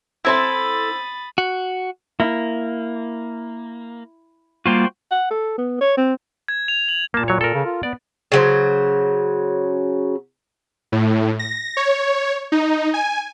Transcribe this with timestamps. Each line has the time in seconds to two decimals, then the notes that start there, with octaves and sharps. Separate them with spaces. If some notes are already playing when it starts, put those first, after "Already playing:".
0.25 C4 E4 A4 E5 B5 C6 D#6 A6
1.38 F#4
2.20 A#3 E4
4.66 G3 A#3 F4 F#4 C5 G5
5.11 F#5
5.31 A4
5.58 B3
5.81 C#5
5.98 C4
6.48 G#6
6.68 F7
6.88 F#7
7.14 A#2 A#3 A5
7.28 F#3 C#5
7.41 A4 A#4
7.54 C#3
7.65 F4
7.83 B3 D5
8.32 C#3 F#3 C5
10.92 A2
11.39 A#6
11.77 C#5
12.52 D#4
12.94 G#5